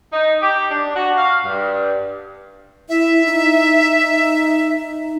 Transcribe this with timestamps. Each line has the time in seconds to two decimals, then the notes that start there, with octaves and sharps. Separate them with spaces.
0.13 D#4
0.42 G4
0.71 D4
0.94 F#4
1.17 F5
1.44 G2
2.89 E4 E5
3.25 D#4